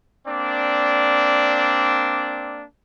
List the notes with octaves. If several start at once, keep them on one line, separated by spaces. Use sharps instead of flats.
A#3 C4 D4 D5